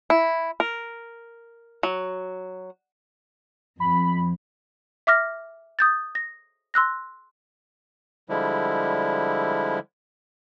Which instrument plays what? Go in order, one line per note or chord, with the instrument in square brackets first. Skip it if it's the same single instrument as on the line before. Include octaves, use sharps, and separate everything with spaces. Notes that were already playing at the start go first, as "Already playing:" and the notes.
[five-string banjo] E4
A#4
F#3
[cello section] F2 [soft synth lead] B5
[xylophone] E5 D6 F6 A#6
D#6 G6 A6
A#6
C6 E6 F#6 A#6
[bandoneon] D3 F3 G3 G#3 E4